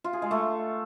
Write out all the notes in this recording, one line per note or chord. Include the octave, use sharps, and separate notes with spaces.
F4
G#4
G#3
A3